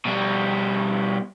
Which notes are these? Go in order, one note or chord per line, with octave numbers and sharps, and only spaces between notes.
B2 G3